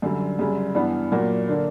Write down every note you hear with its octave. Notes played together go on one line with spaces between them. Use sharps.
F#2 D3 G3
F#2 C#3 G3
G2 E3 B3 D4
A#2 F#3 A#3
D3 A#3 D4